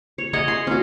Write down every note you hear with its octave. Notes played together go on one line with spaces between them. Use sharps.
C#5
G#4 C#5 D#5 F#5
C6
C#4 F#4